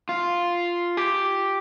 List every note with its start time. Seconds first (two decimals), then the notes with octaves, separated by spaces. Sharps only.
0.09 F4
0.97 G4